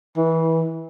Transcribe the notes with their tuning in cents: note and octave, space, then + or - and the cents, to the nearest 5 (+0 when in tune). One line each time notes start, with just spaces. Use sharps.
E3 -20